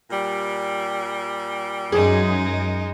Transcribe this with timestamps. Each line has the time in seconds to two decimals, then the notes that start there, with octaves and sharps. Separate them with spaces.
0.11 A#2 G3
1.92 F#2 F#3 G#3 D#4 G#4